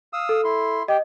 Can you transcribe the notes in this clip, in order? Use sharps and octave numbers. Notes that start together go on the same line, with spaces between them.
F5 D#6 E6
A4
E4 C6
G4 D#5